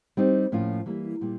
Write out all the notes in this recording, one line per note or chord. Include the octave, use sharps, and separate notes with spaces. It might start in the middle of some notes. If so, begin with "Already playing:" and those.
G3 C4 D#4
A2 F3 A#3 C#4 F4
E3 G3 A#3
A#2 G3 A#3